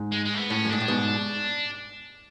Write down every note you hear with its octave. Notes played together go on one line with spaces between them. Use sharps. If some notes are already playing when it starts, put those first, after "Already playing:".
Already playing: G#2
G#3
G#3
A3
B3
A2 C#4
F#2
G#2 D4
A2
G#2 B2